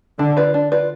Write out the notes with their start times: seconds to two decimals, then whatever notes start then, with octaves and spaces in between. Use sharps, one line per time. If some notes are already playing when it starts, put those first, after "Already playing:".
0.19 D3 D4
0.37 F4 B4 D5
0.54 D4
0.72 F4 B4 D5